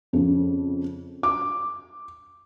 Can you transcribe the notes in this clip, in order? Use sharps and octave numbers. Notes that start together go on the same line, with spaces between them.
F2 C#3
D6